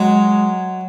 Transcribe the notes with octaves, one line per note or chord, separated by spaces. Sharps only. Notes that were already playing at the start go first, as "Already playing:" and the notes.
Already playing: F#3 G#3